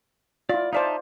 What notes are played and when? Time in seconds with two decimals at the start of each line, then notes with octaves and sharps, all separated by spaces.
0.49 E4 F4 D5
0.73 D#4 C5 D5 E5 F5 A5